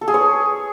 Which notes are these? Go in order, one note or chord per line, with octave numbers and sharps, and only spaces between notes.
A4
G#4
C#5